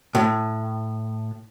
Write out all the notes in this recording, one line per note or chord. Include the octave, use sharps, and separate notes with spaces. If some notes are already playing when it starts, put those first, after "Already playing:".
A2